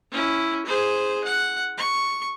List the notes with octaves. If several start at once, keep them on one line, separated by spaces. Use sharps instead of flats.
C#4 E4
G#4 C5
F#5
C#6